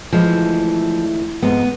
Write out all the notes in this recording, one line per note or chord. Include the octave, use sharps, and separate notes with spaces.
D2 E3 F3 G#3
F2 G#2 G#3 B3